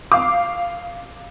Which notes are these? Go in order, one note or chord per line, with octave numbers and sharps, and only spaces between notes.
F5 D6